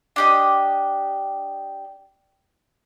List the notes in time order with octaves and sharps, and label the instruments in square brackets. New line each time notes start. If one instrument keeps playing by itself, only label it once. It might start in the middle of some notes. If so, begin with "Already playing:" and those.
[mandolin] D4 G4 D#5